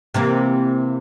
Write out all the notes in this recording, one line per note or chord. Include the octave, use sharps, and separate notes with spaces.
C3 E3 A#3